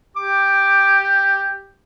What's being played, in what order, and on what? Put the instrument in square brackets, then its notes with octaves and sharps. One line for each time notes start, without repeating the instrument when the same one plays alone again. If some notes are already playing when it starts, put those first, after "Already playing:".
[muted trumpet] G4 [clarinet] D6